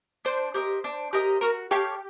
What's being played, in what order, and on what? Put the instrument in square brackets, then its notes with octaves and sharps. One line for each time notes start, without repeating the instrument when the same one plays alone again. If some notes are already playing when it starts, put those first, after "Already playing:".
[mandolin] D4 [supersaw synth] C5
[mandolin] G4 A#4 D#5
D4
G4 A#4 D#5
[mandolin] F#4 [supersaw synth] A#4
[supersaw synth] G4 [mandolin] A4 C#5 F5